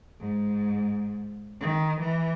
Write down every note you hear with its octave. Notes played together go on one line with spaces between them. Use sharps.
G#2
D#3
E3